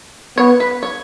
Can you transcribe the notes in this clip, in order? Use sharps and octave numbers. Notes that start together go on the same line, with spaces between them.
B3 C#5
B4
C#5